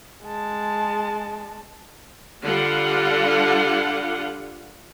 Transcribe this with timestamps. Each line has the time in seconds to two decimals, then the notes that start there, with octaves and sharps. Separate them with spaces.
0.23 G#3 A5
2.43 D3 G3 F4 F#5